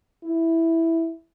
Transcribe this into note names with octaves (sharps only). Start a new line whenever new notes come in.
E4